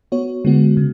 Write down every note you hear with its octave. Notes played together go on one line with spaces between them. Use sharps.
B3 F#4 C#5
D3 G#3 B3 F#4
C#3